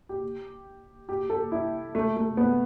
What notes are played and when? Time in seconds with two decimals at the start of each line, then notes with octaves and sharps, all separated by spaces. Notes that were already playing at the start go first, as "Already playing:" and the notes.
0.09 G4
1.09 G4
1.30 A4
1.52 E4
1.95 A3
2.17 A3
2.37 B3